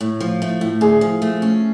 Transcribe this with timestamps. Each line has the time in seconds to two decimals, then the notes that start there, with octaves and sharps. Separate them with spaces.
0.01 A2
0.20 F3
0.42 A3
0.61 A2
0.81 D3 G#4
1.01 F3
1.22 A3
1.42 C#4